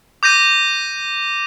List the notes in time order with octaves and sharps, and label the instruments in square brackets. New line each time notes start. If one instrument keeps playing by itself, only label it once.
[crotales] D6 G6 A#6 D#7